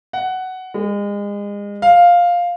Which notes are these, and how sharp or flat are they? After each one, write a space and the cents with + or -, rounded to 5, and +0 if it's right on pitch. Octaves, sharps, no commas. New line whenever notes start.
F#5 +10
G#3 -35
F5 +5